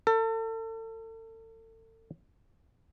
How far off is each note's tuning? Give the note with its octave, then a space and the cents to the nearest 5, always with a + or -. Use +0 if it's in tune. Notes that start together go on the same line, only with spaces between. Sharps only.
A4 +35